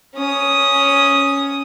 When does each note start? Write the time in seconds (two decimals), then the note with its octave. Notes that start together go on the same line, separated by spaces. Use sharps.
0.15 C#4 D#6